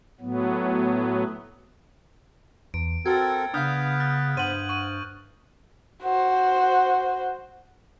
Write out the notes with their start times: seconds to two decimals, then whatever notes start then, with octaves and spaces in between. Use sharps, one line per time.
0.20 A2 F#3 B3
2.74 E2 D7
3.06 C4 F#4 A4 A#4 G#6 A6
3.54 C#3 B3 D4 B4 F5 D#6 F6 G6
4.00 F6 F#6 A6
4.37 G2 C5 F#5 D#7 F#7
4.69 C#6 D#7
6.03 F#4 C5